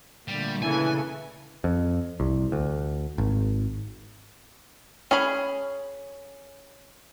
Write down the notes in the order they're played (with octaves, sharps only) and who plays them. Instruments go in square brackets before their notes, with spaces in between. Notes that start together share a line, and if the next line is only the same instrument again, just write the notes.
[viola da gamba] A#2 D3 A3 [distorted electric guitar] G3
[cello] C#3 A4 [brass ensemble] E3 [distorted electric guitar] G#5
[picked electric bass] F2
C2
D2
G#1
[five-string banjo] C#4 G#4 B5